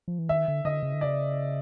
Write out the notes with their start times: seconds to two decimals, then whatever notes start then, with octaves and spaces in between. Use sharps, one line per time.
0.08 F3
0.19 E3
0.29 D#3 E5
0.48 D3
0.65 D3 D#5
0.83 C#3
0.94 D3
1.01 C#3 D5